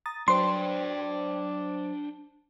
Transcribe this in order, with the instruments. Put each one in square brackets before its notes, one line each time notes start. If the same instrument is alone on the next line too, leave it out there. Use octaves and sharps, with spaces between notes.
[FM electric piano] A#5 D#6 A6
[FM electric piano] F#3 C5 [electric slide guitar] D4 G5 [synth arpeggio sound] C6